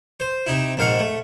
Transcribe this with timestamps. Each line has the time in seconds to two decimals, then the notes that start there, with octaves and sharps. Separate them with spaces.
0.20 C5
0.46 C3 D#4 E4
0.77 A#1 G#2 D#3 F5 F#5
0.99 A3